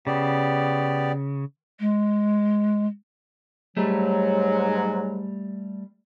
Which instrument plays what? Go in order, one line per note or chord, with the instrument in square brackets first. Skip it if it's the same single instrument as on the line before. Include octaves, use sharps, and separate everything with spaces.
[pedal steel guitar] C#3 [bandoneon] B3 G4 D5
[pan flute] G#3
[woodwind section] G#2 F#3 [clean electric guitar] G3 A3